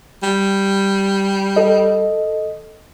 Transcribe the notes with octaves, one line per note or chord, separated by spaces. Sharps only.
G3
A4 D#5